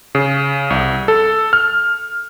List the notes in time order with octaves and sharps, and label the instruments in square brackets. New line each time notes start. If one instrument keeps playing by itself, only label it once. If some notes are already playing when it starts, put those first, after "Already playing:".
[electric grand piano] C#3
C2
A4
F6